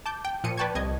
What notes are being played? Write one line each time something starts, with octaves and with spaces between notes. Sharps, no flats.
A5 D6 G6
G5
A#2 F3 C#7 D#7
B4 D5 G5 A5 C#6 G#6
C2 D#5 G#6